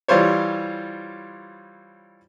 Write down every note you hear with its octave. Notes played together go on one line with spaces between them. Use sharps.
E3 G3 F4 C5 C#5